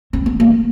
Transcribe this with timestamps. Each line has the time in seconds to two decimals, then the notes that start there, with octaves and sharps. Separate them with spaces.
0.13 C4
0.26 B3
0.40 A#3